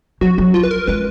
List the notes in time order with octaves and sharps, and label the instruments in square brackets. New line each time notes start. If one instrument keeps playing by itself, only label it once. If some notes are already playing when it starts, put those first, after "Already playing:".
[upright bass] F#3 [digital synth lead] F#4
[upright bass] F#3
[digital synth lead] F4
B4
A#4
[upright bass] G#3 [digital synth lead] B4